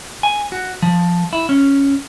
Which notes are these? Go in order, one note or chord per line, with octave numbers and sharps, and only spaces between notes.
G#5
F#4
F3
E4
C#4